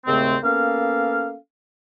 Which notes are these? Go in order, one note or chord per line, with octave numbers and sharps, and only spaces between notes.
D#2 G#2 C#3 A3 C4
A#3 B3 C#4 A4 F5